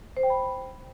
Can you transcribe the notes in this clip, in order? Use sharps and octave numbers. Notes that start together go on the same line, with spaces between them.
C5
G5
B5